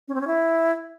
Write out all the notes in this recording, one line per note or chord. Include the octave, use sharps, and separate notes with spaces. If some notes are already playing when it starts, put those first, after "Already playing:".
C#4
C4
C#4
E4